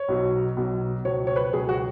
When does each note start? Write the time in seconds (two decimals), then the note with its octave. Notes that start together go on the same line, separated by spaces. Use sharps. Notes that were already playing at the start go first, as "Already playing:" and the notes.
Already playing: C#5
0.08 B1 B2 F#3
0.57 B1 B2 F#3
1.04 C#2 B2 F#3 C#5
1.27 C#5
1.36 B4
1.53 C#2 B2 F#3 G#4
1.69 F#4